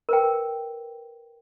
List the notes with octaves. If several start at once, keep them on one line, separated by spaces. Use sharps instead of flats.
A#4 B4 G5